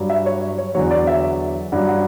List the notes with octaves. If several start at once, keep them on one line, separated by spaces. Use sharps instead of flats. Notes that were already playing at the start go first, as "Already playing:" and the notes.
Already playing: G2 F#3
E5
C#5
C#5
E2 D3 F#3 C#5
D5
E5
G2 F#3 F#5
F#5